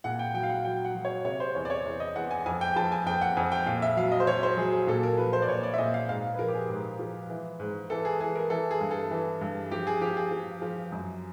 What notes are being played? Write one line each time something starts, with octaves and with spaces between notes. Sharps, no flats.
A#2 F#5
G5
F#3 G5
F5
F#5
F#3 G5
F#5
F#3
C#5
C3 C#5
C5
E2 C#5
D5
C#5
E2
D#5
E2 F#5
G#5
F2 G#5
G5
F3 A5
G#5
F2 G5
F#5
F2 G#5
G5
A#2 F5
E5
F#3 F5
D#5
C5
F#3 C#5
C5
F#3 G#4
G#4
A#2 A4
A#4
F3 B4
C5
D5
A#2 C#5
D5
E5
A#2 D#5
F5
G#2 F5
B4
F3 A#4
G4
G#4
G#2
F3
E3
G#2
E3 A4
G#4
E3 G#4
A#4
E3 A4
G#4
G2
A4
E3
G2
F3 G4
G#4
F3 G4
G#4
F3
F3
F#2